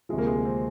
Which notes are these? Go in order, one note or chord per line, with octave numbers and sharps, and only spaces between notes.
D2 C3 F3 G#3
A#3
G#3
A#3
C4